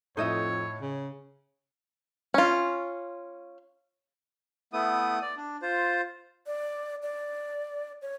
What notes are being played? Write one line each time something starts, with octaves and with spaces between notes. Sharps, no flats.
F2 A2 D#4 C#5 D#5 E5
C#3
C#4 F4
A3 B3 E4 D#6
D5
D4
F4 C5
D5
D5
C#5